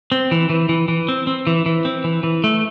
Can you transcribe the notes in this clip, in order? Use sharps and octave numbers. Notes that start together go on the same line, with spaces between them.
C4
E3
E3
E3
E3
C4
C4
E3
E3
C4
E3
E3
A3